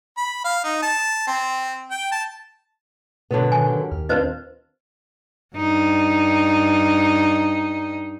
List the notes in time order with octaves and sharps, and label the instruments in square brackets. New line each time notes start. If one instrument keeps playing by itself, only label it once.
[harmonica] B5
F5
D#4
A5
C4
G5
A5
[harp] G#1 [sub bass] B2 [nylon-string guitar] D3 F#3 B3
[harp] D#3 [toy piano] G#5
[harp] A#3 G4
[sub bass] D#2 [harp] F6
[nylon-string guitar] C4 D4 F4 [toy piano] B4 C5 D#5
[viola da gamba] G2 D#4